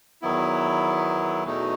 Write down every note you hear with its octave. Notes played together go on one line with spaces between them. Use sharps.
E2 D#3 F#3 B3 E4
E2 B2 A3 D#4